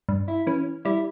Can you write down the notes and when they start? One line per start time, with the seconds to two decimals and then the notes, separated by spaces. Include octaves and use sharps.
0.09 G2
0.28 E4
0.47 E3 C#4
0.85 G3 E4